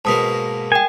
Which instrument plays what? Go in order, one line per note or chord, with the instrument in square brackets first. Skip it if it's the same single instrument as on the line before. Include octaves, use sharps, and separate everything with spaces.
[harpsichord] G#2 B2 A#3 [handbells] A5 D#6 B6
[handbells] A#4 G5 [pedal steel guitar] G#5